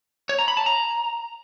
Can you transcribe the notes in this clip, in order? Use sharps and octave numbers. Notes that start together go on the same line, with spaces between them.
C#5
A#5
B5
A5
A#5